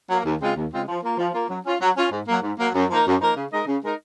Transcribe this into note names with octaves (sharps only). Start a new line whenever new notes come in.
F#3 A#3
D#2
C#3 G#3 C4 F4
D#2
C#3 G#3 C4 F4
F3
A#3 F4
F3
A#3 F4
F#3
C#4 F4
F#3
C#4 F4
G#2
F#3 A#3
G#2
F#3 A#3
F#2
F3 A#3 D#4 A#4
F#2
F3 A#3 D#4 A#4
C#3
G#3 D#4 A#4 D#5
C#3
G#3 D#4 A#4 D#5